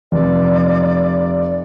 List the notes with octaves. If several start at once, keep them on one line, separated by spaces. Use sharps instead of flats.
F1 D5